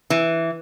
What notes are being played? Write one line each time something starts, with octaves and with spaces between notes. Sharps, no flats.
E3